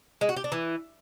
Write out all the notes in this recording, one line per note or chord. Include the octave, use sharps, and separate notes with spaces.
G#3
F#4
G4
D4
E3